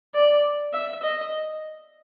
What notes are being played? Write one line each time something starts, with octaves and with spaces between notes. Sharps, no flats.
D5
E5
D#5